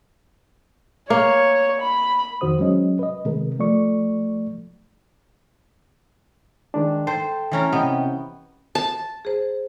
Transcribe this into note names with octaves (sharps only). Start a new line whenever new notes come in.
A#3 C#5
B5
F2 D#3 F#4 C5 D#6
F#3 G#3 C#4 D#5
B4 D#5
C3 D#3 G#3 A#4
F3 A3 D5 C#6
D#3 G#3 D4
A4 C5 G5 A5
E3 C#4 A#4
C3 B3 D#5 G5
A5
G#4 C5